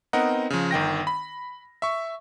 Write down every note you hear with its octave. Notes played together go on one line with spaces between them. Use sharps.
B3 C4 D#4 A#4 D#5 F#5
C#3 F3
G1 D#3 G5 A#6
B5
E5 C#6